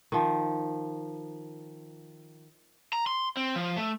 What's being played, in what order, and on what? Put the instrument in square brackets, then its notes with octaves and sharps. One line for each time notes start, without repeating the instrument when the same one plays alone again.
[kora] D#3 F3
[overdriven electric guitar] A#5
C6
C4
F3
A3